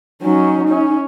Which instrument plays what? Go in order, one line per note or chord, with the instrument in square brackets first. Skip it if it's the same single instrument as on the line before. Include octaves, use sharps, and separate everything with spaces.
[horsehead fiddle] F#3 C#4 [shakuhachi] D#4
[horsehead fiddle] C#4